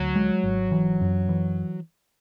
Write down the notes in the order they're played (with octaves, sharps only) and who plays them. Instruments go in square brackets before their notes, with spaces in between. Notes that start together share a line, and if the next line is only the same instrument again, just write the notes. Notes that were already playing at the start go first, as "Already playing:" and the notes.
Already playing: [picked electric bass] D2 [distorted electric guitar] F#3
[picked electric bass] G#3
G#1
E3
F#2
E3